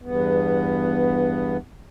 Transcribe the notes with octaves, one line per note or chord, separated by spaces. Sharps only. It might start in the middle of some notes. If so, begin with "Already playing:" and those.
E2 G2 B3